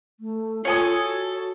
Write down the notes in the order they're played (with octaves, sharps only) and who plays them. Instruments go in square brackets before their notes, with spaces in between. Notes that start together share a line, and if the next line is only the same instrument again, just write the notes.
[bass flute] A3
[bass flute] F4 [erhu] A4 [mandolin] C#5 G#5 D#6
[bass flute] F#4